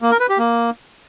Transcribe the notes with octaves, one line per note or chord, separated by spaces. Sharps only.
A#3
A#4
B4
G4
A#3